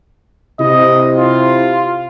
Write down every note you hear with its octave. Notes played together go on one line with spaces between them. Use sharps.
C3 E4 D#5
F4